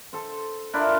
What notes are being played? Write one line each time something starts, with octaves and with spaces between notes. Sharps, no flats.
A4 C5
D4 E4 F4 A#4